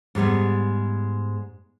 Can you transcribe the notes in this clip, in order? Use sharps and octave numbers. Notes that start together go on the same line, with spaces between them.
G#2 G3 G#3 B3